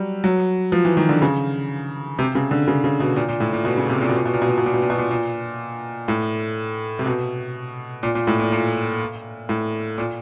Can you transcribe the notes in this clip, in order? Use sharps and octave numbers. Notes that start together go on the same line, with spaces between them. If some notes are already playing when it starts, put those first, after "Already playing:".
Already playing: F#3 G3
F#3
F3
E3
D#3
D3
C#3
C3
C#3
D3
C#3
C#3
B2
A#2
A#2
A2
A#2
B2
C#3
C3
A#2
B2
A#2
B2
A#2
B2
A#2
B2
A#2
B2
A#2
B2
A#2
A#2
A2
C3
B2
A#2
A#2
A2
A#2
A#2
A2
A#2